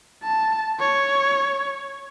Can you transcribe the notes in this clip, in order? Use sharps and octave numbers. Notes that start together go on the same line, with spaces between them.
A5
C#5